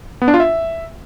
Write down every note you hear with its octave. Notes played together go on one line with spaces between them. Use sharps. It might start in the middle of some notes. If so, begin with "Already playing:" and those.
B3
D4
F4
E5